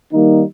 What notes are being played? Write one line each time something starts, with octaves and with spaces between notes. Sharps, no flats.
D#3 G3 A#3 D#4